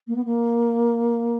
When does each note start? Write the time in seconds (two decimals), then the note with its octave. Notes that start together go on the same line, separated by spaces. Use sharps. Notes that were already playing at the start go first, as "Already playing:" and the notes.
0.07 A#3
0.16 B3
0.25 A#3